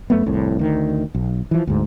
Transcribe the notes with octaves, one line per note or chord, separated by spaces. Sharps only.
F#2 A3 B3
F1 C2 A2
D2 D#3
B1
E3 F3
D2 G#2